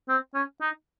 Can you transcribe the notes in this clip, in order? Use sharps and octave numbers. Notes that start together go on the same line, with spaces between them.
C4
C#4
D#4